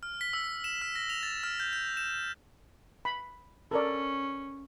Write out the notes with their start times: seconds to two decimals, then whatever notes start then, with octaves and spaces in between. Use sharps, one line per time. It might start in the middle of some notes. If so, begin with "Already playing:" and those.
0.03 F6
0.21 B6
0.33 E6
0.64 E7
0.82 F6
0.96 A#6
1.10 F7
1.23 A6
1.43 F6
1.60 G6
1.73 G6
1.97 E7
3.05 B5
3.71 C#4 A4 A#4 D5